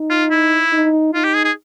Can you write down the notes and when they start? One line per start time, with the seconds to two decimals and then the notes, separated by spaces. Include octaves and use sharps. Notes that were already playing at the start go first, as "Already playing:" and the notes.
Already playing: D#4
0.10 F4
0.31 E4
0.73 D#4
1.14 D#4 F4
1.24 G4
1.34 G#4
1.44 G#4